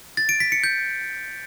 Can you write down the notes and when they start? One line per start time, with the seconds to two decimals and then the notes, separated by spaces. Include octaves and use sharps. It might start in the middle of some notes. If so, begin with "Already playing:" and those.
0.17 A6
0.29 D7
0.40 B6
0.52 C#7
0.64 G6